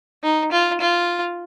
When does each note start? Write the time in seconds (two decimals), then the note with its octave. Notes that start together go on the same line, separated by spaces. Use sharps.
0.23 D#4
0.52 F4
0.81 F4